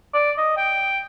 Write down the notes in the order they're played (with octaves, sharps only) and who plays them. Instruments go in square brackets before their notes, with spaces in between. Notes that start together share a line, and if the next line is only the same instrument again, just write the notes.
[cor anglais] D5
D#5
G5